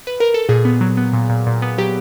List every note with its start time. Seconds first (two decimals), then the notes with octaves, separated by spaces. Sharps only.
0.07 B4
0.20 A#4
0.34 A4
0.49 A#2 G#4
0.65 B3
0.81 F#3
0.97 B3
1.13 A#2
1.29 A#2
1.46 A#2
1.62 B3
1.78 F#3 G4